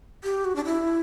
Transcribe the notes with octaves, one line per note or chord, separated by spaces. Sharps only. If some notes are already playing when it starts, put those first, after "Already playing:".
G4
F#4
D4
E4